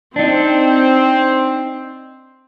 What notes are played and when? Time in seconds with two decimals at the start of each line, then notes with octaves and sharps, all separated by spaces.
0.16 C4 D4 D#4